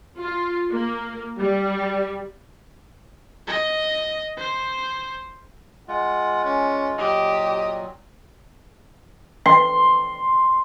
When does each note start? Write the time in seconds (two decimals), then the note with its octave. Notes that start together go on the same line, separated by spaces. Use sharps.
0.20 F4
0.72 A#3
1.40 G3
3.47 D#5
4.38 C5
5.88 G#3 F4 F#5
6.44 C#4
6.98 A#2 F#3 G4 D#5
9.46 C6